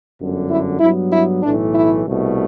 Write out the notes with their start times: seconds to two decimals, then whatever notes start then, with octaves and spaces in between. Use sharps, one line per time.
0.18 G1 F#2 D3
0.49 E4
0.80 G2 F#3 B3 E4
1.12 E4
1.43 B1 A2 E3 A3 D4
1.75 E4
2.05 C2 B2 A3